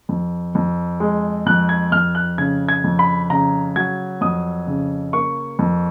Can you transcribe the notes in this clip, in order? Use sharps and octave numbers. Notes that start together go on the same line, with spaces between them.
F2
F2
G#3
F2 F#6
G#6
F2 F6
F#6
C#3 G#6
G#6
F2
B5
C#3 A#5
F#3 G#6
F2 D#6
C#3
A#3 C#6
F2